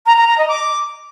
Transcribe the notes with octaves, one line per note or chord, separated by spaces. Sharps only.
A#5
A#5
A#5
D#5
D6